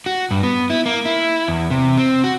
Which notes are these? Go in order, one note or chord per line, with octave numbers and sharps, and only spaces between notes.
F#4
G2
B3
E4
A#3
E4
E2
C3
C4
F#4